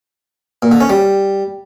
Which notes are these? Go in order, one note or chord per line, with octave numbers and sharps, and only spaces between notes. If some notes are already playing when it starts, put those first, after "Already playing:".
A#2
D3
C#4
G3